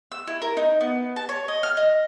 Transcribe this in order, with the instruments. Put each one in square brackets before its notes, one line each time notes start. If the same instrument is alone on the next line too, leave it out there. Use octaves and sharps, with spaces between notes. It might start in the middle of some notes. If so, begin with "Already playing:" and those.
[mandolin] E6
E4
A#4
D#4
B3
A5
C#5
D#5
F6
D#5